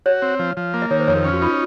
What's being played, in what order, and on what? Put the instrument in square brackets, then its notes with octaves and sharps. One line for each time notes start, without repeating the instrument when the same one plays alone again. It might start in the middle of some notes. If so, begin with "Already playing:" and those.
[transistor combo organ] F#4 [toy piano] C#5
[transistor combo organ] C4
F3
F3
A#3
[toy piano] D#5
[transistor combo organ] D#3 [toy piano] C#5
[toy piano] C5
[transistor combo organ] F2 [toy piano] C#5
[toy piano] A#4
[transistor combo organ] C#4
[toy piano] F#4
[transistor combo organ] D#4 [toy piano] F4